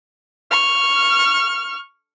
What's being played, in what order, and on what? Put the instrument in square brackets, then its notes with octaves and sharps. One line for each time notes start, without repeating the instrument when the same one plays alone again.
[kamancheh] C#6 F6